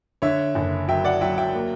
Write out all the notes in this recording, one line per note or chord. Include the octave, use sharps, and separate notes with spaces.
D3 C#5 E5
F#1
F#3 E5 G5
D5 F#5
F#3 E5 G5
E5 G5
A#3